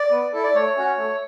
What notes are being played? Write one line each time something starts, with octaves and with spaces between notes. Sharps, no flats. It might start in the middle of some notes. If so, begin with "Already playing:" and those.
Already playing: D5
B3
E4 A4
D5
A3 C#5
C#4 F#4
A3